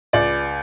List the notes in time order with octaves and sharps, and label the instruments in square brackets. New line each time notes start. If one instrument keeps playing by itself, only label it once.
[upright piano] C#2 D5